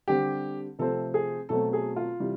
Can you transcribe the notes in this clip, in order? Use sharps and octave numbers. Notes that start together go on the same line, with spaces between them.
D3 G3 C4 G4
C3 F3 A3 C4 A4
G#4
B2 F#3 A3 C4 A4
G#4
F4
C3 E3 G3